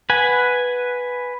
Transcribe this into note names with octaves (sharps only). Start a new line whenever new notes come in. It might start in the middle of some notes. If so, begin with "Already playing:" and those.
B4 F#5 G#5